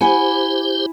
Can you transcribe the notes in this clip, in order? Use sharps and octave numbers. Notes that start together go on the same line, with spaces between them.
E4 G4 C5 F#5 G#5